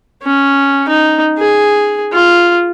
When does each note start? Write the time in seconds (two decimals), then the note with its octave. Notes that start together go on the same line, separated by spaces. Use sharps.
0.24 C#4
0.89 D#4
1.38 G#4
2.13 F4